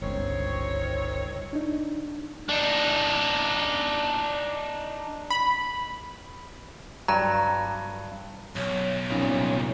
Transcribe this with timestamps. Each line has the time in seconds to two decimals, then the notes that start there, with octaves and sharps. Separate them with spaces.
0.02 G1 C#2 D#3 C4 C#5
1.53 D4 D#4
2.49 D4 D#4
5.31 B5
7.08 G2 F#3 A#5
8.56 B1 C#5
9.11 C2 A#2 B3 C#4 D#4